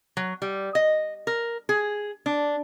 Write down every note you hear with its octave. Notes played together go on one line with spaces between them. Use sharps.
F#3
G3
D#5
A#4
G#4
D4